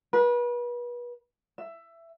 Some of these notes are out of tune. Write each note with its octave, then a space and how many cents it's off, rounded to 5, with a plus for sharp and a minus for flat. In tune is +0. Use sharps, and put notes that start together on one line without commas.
B4 -35
E5 +15